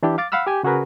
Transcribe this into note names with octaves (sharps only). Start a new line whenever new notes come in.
E3 D4 E4 G4
F5 D6 A6
F5 F#5 B5 E6 F6
G4 G#5
C#3 F#4 G#4 A#4 B4